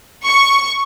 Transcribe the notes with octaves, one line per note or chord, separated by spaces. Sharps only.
C#6